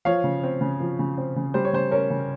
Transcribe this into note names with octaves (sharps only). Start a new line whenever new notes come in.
F3 C#5 F5
C#3
C4
C#3
F3
C#3
C4
C#3
G3 C5
C#5
C#3 C5
C#4 A#4 C#5
C#3